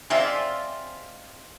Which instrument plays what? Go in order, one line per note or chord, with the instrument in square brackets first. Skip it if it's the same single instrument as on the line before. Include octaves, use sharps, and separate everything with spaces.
[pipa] G#3 C4 F4 [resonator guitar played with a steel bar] D5 E5